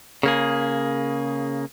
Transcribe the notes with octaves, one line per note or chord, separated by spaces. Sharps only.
C#3 A#3 G#4